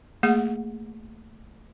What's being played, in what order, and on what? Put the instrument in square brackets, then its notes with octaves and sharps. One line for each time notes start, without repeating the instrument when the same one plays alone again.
[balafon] A3 A#3 G#4 F#5